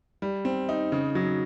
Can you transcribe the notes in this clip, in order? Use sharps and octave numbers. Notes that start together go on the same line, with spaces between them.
G3
C4
D#4
C#3
F#3